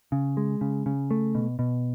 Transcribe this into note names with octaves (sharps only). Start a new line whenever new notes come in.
C#3
G#3
C#3
C#3
A3
B2
B2